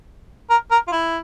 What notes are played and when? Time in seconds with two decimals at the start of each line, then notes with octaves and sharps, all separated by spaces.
0.50 A#4
0.71 A#4
0.88 F4
0.92 E4